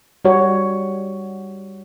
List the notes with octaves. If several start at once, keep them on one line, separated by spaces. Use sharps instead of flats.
G3 F#4 C#5